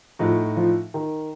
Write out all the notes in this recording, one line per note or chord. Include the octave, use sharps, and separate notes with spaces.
A2 F3 A3 D#4 F#4
F3
D#3